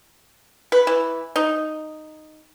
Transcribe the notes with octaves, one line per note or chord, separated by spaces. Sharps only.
B4
E3
D#4